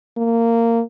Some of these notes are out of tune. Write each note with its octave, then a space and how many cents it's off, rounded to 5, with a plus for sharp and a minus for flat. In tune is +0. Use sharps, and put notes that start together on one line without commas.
A#3 -15